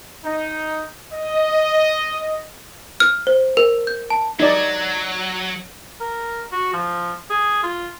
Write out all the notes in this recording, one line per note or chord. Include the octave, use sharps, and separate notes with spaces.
D#4
D#5
F6
C5
A#4
G6
A5
F#3 D#4 D5
A#4
F#4
F3
G#4
F4